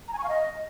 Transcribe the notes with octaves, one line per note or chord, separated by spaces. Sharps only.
A#5
G#5
C#6
F5
D#5